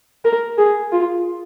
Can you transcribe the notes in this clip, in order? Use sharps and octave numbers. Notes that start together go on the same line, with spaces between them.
A#4
G#4
F4